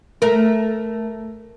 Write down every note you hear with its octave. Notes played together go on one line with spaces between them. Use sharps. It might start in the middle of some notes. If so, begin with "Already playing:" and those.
A3 A#4